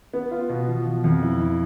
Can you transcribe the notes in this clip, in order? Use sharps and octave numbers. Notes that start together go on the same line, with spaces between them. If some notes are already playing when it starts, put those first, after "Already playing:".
B3
F4
B2
F3
F3
F2
E4
E4